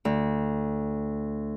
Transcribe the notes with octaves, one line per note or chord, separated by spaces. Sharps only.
D2